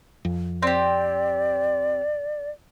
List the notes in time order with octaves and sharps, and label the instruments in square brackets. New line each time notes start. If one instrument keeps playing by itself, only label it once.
[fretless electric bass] F2
[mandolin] C4 G4 [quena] D5